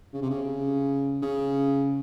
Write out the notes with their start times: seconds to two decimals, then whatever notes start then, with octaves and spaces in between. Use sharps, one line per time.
0.13 C#3
0.22 C3
0.30 C#3
1.22 C#3